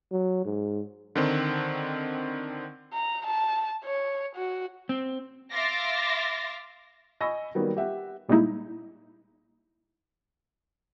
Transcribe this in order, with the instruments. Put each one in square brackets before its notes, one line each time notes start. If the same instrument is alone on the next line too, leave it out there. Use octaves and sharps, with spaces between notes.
[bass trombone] F#3
G#2
[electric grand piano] D3 D#3 C4
[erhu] A#5
A5
C#5
F#4
[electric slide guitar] C4
[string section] E5 F5 C6 D6 A6 A#6
[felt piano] D#5 G#5 B5 C#6 E6 A#6
D#3 F#3 G3 A#3 B3
G4 E5 F#5
[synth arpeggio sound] A#2 G3 G#3 A#3 D#4 E4